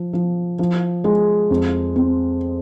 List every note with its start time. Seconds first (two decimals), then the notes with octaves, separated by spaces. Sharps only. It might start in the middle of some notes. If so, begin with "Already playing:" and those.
Already playing: F3
0.13 F3
0.59 F3
1.04 G#3
1.50 F2
1.96 C4